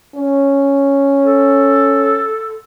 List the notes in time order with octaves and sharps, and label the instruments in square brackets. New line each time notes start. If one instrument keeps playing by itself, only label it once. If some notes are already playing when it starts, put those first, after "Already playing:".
[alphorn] C#4
[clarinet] A4